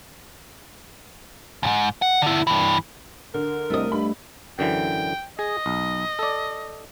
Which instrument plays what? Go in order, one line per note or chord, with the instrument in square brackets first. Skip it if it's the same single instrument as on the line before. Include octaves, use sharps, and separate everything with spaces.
[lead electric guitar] C#2 G#2
F#5
D3 E4
G2 E3
[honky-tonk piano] D3 [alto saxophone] A#4
[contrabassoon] C2 [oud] A3 D#5
[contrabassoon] G2 [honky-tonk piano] B5
[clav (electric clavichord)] F#2 D3 E3 [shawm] G5
[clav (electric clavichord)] G#4 [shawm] D#5
[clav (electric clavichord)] B1
A4 D5